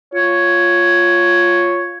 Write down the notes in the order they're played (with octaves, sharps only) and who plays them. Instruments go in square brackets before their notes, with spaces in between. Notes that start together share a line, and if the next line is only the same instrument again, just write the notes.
[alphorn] F4 [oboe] C#5